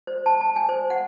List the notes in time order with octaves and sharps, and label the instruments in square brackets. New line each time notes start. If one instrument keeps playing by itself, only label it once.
[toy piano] C5
A5
A5
G#5
C5
F#5